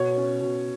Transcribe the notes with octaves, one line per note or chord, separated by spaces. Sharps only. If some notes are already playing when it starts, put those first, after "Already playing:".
Already playing: B2 C#5
C#4
B2